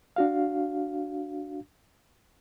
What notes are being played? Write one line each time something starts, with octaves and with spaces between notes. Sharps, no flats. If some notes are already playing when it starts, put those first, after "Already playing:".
D4 F#4 F5